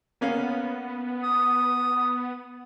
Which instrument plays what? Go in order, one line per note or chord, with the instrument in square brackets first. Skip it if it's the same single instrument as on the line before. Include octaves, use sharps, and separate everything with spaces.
[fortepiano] A#3 C#4 F5 [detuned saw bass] B3
[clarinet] D#6